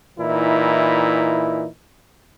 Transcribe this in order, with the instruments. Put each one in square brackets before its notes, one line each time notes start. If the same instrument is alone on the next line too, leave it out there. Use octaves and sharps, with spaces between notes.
[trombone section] A#2 E3 D#4 E4